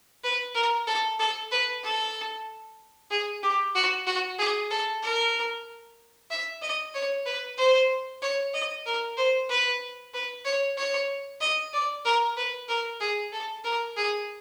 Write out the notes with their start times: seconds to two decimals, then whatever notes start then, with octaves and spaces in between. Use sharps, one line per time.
0.24 B4
0.55 A#4
0.87 A4
1.19 A4
1.52 B4
1.84 A4
3.11 G#4
3.43 G4
3.75 F#4
4.07 F#4
4.39 G#4
4.71 A4
5.03 A#4
6.31 E5
6.62 D#5
6.94 C#5
7.26 B4
7.58 C5
8.22 C#5
8.54 D#5
8.86 A#4
9.17 C5
9.50 B4
10.14 B4
10.45 C#5
10.77 C#5
11.41 D#5
11.73 D5
12.05 A#4
12.37 B4
12.69 A#4
13.00 G#4
13.32 A4
13.64 A#4
13.97 G#4